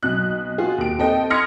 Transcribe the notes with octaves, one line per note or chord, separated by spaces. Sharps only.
B1 B2 F#6
F4 F#4 G#4
D#2 D7
C4 A4 D#5 G5
C6 D#6 F6 G#6 A#6 C#7